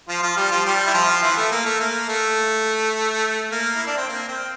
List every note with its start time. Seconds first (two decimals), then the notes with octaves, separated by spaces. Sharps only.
0.09 F3 F4
0.23 F3 F4
0.37 G3 G4
0.51 F3 F4
0.65 G3 G4
0.86 E4
0.94 F3 F4
1.23 E3 E4
1.37 A3
1.52 A#3
1.66 A3
1.80 A#3
2.09 A3
3.52 A#3
3.76 E4
3.87 D4
3.98 C4
4.09 A#3
4.28 C4